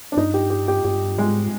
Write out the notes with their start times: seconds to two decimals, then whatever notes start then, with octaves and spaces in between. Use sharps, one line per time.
0.12 D4
0.17 G2 D#4
0.34 G4
0.50 G4
0.68 G4
0.84 G2 G4
1.18 G#2 G#3